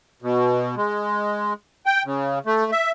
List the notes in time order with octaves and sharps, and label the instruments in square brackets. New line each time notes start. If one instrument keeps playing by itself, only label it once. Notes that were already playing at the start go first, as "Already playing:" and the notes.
[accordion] B2
G#3
G5
C#3
A3
E5